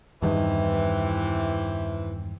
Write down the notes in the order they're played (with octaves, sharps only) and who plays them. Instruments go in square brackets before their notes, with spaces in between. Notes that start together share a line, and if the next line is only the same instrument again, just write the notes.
[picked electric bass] E2 G2 D#3 [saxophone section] C3 E3